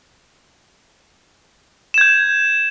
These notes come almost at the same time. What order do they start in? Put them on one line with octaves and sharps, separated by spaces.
E7 G#6 G6